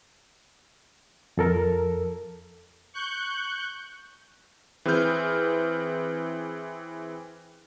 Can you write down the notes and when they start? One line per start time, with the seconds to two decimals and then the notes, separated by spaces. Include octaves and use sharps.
1.37 F2 A4 A#4
2.94 C#6 F#6 G6
4.85 E3 C4 G#4 B4 F6 G6